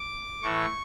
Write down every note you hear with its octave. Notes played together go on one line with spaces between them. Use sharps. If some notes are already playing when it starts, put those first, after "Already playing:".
Already playing: D6
A2 E3 C#6